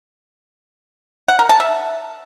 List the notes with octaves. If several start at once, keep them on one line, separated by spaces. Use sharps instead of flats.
F#5
A#4
A5
E5